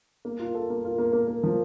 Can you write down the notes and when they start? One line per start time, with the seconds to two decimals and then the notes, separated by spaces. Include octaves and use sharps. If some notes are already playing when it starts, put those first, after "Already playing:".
0.25 A#3
0.39 F4
0.55 A4
0.70 A#3
0.85 F4
0.98 A#3
1.13 A#3
1.28 A#3
1.43 F3